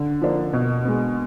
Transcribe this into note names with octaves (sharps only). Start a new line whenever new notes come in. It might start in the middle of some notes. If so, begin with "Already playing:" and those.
Already playing: D3
F3 A#3 D4
B2
G#3 B3